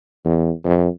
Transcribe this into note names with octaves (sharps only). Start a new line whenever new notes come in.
E2
F2